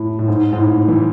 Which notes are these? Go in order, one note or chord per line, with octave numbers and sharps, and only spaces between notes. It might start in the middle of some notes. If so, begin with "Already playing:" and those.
Already playing: A2
A2
G#2
G#2
A2
E3